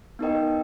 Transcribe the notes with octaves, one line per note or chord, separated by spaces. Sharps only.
B3 D#4 A#4 D#5 G5